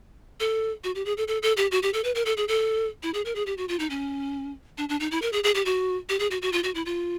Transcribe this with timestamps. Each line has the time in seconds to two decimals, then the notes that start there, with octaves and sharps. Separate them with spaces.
0.40 A4
0.84 F#4
0.95 G4
1.06 G#4
1.17 A4
1.28 A4
1.43 A4
1.57 G4
1.71 F#4
1.83 G4
1.94 A4
2.04 B4
2.15 A#4
2.26 A4
2.37 G#4
2.48 A4
3.03 E4
3.14 G#4
3.25 A#4
3.35 G#4
3.46 G4
3.58 F#4
3.69 F4
3.79 D#4
3.90 C#4
4.78 D4
4.89 D4
5.00 D#4
5.11 E4
5.22 A#4
5.33 G#4
5.44 G#4
5.55 G4
5.65 F#4
6.09 G4
6.20 G#4
6.31 F#4
6.42 F#4
6.53 F4
6.64 F#4
6.75 E4
6.86 F4